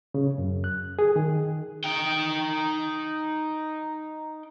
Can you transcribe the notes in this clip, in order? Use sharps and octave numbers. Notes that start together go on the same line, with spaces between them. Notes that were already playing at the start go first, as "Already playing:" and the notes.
C#3
F#2
F#6
G#4
D#3
D#4 G5